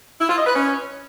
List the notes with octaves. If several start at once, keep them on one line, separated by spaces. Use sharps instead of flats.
E4
F4
D#5
B4
C#4